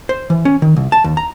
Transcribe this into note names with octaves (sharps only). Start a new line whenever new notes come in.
C5
E3
C#4
D#3
C2
A5
D#2
A#5